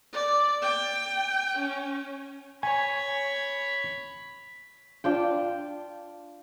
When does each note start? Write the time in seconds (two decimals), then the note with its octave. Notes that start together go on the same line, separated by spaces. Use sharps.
0.13 D5
0.62 G5
1.58 C#4
2.63 C#5 G#5 B5
5.04 D4 F4 G5